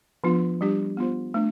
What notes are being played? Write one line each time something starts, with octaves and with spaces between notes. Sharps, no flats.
F3 B3 D4 F4
G3 D4 G4
B3 F4 C5
A3 D4